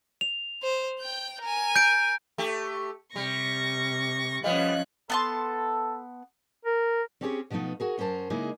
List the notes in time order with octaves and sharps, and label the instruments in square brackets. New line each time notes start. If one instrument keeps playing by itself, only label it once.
[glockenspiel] F7
[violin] C5
G5 G6
A#4 G#5
[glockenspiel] G6 D7
[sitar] A3 G4
[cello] C3 [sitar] G3 [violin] C#6 A#6
[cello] F3 C#4 [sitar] G3 B3 [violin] C#5 F#6 [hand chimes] D#5 F5
[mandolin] B3 A5 C6 [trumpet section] A4
[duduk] A#4
[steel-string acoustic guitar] C4 C#4 G4 G#4 C5 C#5
B2 F3 A3 B3 D#4
F#4 G#4 A#4
F#2 C#4 A#4 C5 A5
C#3 G#3 A#3 D#4 E4 G#4